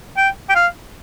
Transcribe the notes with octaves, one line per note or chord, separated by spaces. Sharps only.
G5
G5
F5